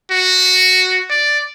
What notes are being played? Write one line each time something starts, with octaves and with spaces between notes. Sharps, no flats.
F#4
D5